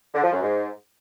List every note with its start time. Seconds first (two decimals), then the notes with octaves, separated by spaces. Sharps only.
0.14 D3
0.24 F3
0.33 F#2
0.42 G#2